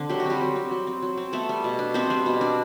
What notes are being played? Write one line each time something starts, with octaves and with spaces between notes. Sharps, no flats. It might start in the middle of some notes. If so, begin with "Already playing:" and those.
Already playing: D3 C4
F#3 G4
F#4
G3 C4 G4
F#3
C4
F#3
C4
F#3
C4
A3 B3 A4
G3
B2
D4
B3 C4 C5
G3
B2
D4